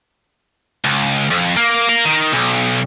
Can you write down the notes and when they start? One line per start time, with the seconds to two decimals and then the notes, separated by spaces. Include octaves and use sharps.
0.85 C#2
1.31 F2
1.57 A#3
1.89 A#4 F5
2.05 D#3
2.33 B1